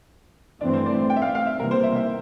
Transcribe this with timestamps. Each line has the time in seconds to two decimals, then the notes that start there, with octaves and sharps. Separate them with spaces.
0.61 G2 E3 A3 C4 D4
0.74 C5
0.86 D5
1.10 G5
1.16 E5
1.22 F5
1.35 F5
1.46 E5
1.60 C3 E3 G3 A#3 A#4
1.71 C5
1.83 E5
1.96 E5